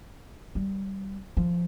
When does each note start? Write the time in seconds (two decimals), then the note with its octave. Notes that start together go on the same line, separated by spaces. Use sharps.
0.55 G3
1.37 F3